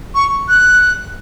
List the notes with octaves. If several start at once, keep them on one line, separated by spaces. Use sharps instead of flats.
C#6
F#6